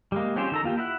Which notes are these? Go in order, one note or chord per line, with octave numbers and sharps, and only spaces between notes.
G3 G#3 A#3
C4 C#4 F4 G4 C5
D#3 A4 A#5
A#3 F4 G4
E4 E5 F#5